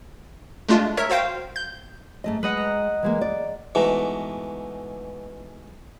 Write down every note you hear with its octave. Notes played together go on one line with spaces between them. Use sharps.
G#3 A3 D4 F4
A#4 C#5 E5
F#4 C5 F5 G5
G6
G#2 A3 D#5
G#3 B4 D#5 F#5
A#5
E3 G#3 A#3
D5
G#2 B2 E3 A3